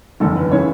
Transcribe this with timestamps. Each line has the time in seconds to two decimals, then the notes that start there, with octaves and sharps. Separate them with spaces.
0.20 F#1 E2 D3 A4
0.36 B4
0.51 C#3 E3 C#5